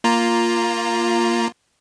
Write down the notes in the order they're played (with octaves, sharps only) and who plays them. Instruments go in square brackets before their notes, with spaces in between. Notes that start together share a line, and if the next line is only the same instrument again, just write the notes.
[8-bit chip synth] A#3 F4 A#5